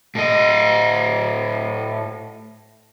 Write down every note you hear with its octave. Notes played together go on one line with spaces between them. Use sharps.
A2 D#5